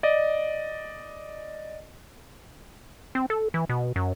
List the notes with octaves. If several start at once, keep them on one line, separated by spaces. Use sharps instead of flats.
D5 D#5
C4
A4
E3
B2
F#2